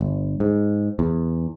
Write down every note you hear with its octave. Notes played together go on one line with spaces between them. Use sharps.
G1
G#2
E2